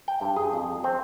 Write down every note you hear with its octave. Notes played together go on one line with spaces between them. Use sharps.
G5
G2
G#4
F2
C4